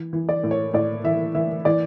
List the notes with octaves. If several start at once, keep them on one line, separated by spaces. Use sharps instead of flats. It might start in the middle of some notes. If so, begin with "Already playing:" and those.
Already playing: E3
E3
D5
A2
C#5
A2 D5
E3 E5
E3 E5
E3 D5